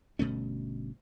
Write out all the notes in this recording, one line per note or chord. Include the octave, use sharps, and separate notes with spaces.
G1 B2 A3 C#4